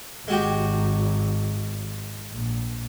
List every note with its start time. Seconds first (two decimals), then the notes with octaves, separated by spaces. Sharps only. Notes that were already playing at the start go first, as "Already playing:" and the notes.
0.28 G#1 G#3 F#4 G4
2.32 A#1